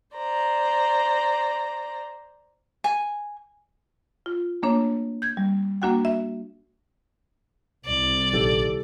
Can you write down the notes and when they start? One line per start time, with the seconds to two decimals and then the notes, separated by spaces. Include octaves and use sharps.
0.15 C5 D5 A#5
2.84 G#5
4.26 F4
4.63 A3 A#3 D4 C#5
5.22 G6 G#6
5.37 G3
5.82 A#3 D4 F#4 F#5 G5
6.05 E5
7.86 C2 D5
8.33 A#1 D#3 G4 A4